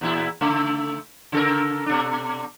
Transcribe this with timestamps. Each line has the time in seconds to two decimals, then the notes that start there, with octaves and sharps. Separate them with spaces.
0.01 E2 A#2 E4
0.41 C#3 A3
1.32 C#3 A4 A#4
1.86 B2 D4